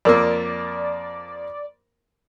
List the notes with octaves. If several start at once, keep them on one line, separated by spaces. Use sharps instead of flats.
F2 A#3 A#4 C#5 D5